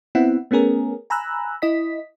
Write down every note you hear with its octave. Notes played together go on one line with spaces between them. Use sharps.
B3 C4 E4 E5 F#5
A3 B3 C#4 G#4 A#4
G#5 A#5 B5 E6 F#6
E4 D#5 B6